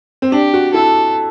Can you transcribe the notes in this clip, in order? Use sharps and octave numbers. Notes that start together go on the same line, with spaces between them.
C4
D4 G4
F#4
E4 A4